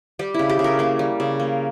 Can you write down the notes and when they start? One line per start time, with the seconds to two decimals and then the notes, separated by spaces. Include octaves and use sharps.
0.19 G3 G4
0.34 C#3 E4
0.49 G4
0.59 C#3
0.64 A#4
0.79 A#3 A#4
0.99 G3
1.20 C#3
1.40 A#3